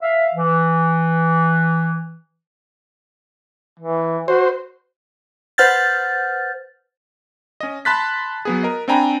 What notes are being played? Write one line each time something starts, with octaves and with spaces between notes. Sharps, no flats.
E5 F5
E3
E3
F#4 C5
B4 C5 F#5 F6 G6 A6
C#4 D#5
A5 B5 C6 F#6 A6 B6
F#3 B3 G#4
A#4 D#5
C4 D4 G5 G#5 A#5 B5